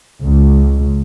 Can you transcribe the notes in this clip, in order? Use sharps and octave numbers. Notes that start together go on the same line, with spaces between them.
C#2